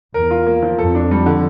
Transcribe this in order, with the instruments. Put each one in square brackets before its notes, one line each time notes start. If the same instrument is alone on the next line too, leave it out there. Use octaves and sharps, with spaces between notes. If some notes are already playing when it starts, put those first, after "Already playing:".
[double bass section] E2 [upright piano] A#4
[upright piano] F4
A#3
F3
[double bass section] F2 [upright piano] A4
[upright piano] D4
G3
D3